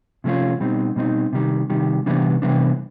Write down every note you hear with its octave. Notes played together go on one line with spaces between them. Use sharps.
C3 F3 A3 C#4 F4
B2 G3 C4 D#4
B2 G3 C4 D#4
C3 D#3 G3
C3 D#3 G3
C3 E3 G3 B3 D4
C3 E3 G3 B3 D4